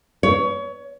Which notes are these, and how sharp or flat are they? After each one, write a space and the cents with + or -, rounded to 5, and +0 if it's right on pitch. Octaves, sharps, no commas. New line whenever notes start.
C#5 +25